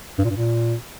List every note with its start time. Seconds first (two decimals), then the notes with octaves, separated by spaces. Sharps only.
0.19 G2
0.25 A#2
0.30 G2
0.36 A#2